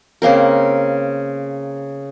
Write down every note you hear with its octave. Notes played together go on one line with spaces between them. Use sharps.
C#3 A#3 C4 A#4